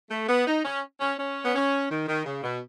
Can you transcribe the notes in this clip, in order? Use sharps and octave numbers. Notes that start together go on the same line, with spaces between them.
A3
B3
D#4
C#4
C#4
C#4
B3
C#4
D#3
D#3
C#3
B2